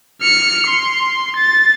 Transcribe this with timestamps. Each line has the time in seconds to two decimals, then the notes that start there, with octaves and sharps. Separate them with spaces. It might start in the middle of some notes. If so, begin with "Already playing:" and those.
0.22 F6 C#7
0.67 C6
1.36 A6